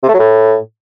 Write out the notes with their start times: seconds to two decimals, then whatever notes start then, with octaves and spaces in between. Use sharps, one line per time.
0.03 C3
0.08 A3
0.14 F#3
0.19 A2